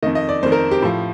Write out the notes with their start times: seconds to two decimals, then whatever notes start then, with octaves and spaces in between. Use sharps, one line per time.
0.03 D#3 D#5
0.06 F2
0.15 D#5
0.29 D5
0.42 F2 C5
0.46 D#3
0.52 A#4
0.71 G4
0.82 A2 F3